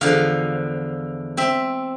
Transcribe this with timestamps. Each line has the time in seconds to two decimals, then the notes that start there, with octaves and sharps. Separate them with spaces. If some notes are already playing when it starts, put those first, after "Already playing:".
0.01 E2 D3 F3 F5
1.37 C4 E5